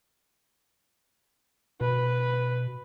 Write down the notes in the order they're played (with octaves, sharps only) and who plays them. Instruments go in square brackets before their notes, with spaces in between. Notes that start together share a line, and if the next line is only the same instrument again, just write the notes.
[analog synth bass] B2 [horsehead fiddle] B4